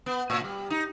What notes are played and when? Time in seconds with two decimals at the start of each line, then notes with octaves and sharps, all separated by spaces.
0.06 B3
0.30 A2
0.44 G3
0.70 D#4